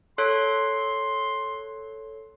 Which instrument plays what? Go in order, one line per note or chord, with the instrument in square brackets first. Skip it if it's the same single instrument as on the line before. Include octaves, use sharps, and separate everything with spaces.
[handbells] A4 C#5 F#6 [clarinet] C6